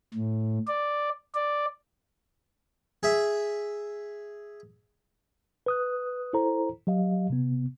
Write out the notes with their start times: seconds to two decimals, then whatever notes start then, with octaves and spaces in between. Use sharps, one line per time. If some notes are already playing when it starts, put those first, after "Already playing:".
0.14 A2
0.68 D5
1.35 D5
3.03 G#4 E5
5.66 B4 D#6 F#6
6.33 E4 A4 C5 A#5
6.87 F#3 G4 D#5 F5
7.30 C3 B3